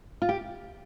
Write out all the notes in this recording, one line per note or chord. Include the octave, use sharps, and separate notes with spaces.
F4
G4